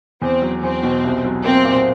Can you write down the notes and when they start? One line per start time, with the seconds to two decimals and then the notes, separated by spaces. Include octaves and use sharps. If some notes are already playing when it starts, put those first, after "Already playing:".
0.22 E2 C4
0.42 F#3
0.63 E2 C4
0.83 B2
1.04 C2
1.24 F#3
1.44 A#3 C4
1.65 A#2